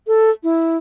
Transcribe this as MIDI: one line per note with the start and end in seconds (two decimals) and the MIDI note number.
0.07 0.30 69
0.43 0.77 64